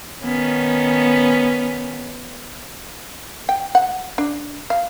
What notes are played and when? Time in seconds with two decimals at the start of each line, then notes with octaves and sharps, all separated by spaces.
0.24 D#3 B3 C#4
3.49 G5
3.75 F#5
4.18 D4
4.70 F5